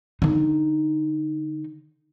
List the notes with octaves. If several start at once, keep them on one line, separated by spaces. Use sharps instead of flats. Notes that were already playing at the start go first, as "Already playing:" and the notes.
D3 D#4